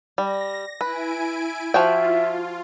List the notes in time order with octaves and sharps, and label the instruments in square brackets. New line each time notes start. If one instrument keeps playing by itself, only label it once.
[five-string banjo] G3 [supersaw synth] A#6
[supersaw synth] E4 G#5 D7 [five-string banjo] B4
[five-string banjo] F3 F#4 G5 [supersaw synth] F4 [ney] E5